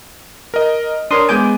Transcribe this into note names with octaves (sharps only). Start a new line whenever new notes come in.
A#4 D#5
D4 A#4 C#5 C6 D#6
G#3 B3 G#5 D6 G6 D#7